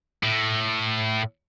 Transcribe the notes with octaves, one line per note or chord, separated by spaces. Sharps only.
A2